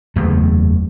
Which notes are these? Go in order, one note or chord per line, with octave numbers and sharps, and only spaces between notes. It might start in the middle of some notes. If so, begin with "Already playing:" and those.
F#1 E2 A3